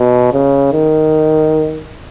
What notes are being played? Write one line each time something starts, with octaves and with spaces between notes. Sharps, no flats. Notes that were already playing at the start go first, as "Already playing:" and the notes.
Already playing: B2
C#3
D#3